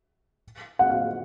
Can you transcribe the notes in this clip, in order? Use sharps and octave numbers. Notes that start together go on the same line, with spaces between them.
F#5
F5